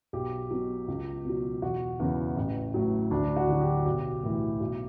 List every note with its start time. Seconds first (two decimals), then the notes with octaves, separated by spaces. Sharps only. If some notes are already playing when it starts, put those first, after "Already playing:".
0.13 B1 G4
0.51 B2 F#3
0.88 C#2
1.25 B2 F#3
1.62 E1 F#4
2.00 E2 C#3 E3
2.37 A1
2.74 A2 F#3
3.11 D2 D4
3.36 F#4
3.48 D3 F#3
3.61 G4
3.86 B1 G4
4.23 A2 E3
4.60 B1